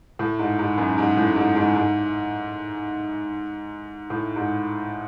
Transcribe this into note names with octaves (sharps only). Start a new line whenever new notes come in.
A2
G#2
G#2
F#2
G#2
A2
G#2
G#2
G#2
A2
G#2